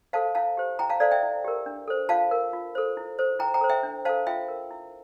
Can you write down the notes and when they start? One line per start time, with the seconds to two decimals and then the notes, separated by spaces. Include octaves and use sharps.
0.13 A4 C5 F5 A5
0.35 E4 F5 A5
0.57 G4 C5
0.79 E4 G5 A#5
0.90 F5 A5
1.00 A4 C5 D5 F5
1.12 E5 G5
1.23 E4
1.44 G4 A#4
1.66 D4
1.88 A4 C5
2.09 F4 F5 A5
2.31 A#4
2.53 F4
2.75 A4 C5
2.97 E4
3.19 A4 C5
3.39 E4 G5 A#5
3.54 G5 A#5
3.61 A4 C5
3.70 E5 G5
3.83 D4
4.05 A4 C5 F5 A5
4.27 F4 E5 G5
4.48 A#4
4.71 E4